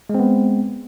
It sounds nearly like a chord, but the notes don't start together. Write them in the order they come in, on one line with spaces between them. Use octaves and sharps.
G#3 C4 B3